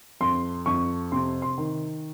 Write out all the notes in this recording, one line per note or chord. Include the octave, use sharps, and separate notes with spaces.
F2 C6
F2 C#6
C3 C6
C6
D#3